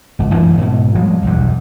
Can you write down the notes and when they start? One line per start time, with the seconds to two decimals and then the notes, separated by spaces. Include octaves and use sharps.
0.19 G#1 C#2
0.34 F#2 E3 A3 A#3
0.57 G#2 B2
0.95 F3 G3 G#3 A#3
1.23 B1 E2 G2